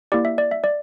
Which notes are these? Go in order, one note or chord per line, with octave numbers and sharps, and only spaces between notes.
A#3 E4 G4 D5
E5
D5
E5
D5